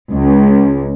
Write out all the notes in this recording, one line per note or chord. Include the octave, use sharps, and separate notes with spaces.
C#2